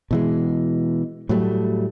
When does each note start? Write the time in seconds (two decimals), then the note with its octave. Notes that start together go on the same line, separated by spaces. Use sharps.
0.11 B2 E3 G#3
1.29 A2 F#3 G3 A3